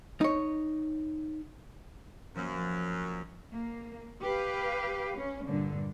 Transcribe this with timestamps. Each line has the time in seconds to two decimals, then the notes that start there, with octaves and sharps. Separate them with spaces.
0.21 D#4 C#5
2.35 F#2 F3 A#3
3.53 A#3
4.22 G4 B4 F5
5.18 C#4
5.47 G2 A#2 D3